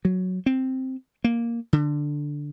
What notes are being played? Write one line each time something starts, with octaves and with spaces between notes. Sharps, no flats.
F#3
C4
A#3
D3